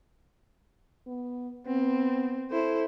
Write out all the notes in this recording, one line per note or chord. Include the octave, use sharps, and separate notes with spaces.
B3
B3 C4
E4 A4 C5